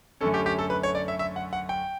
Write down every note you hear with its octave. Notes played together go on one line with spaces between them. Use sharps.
F#2 D3 A3 C#4 A4
G4
G4
A4
B4
C#5
D5
E5
E5
F#5
F#5
G5